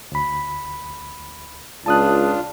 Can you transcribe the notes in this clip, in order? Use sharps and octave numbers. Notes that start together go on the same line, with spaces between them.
D2 B5
C#2 D4 F4 A5 D#6 F#6